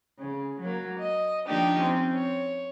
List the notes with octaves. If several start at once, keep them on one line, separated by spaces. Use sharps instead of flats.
C#3
F#3 A#3
D#5
D#3 F3 A#3 D4 D#4 G4
C4 C#4
C#5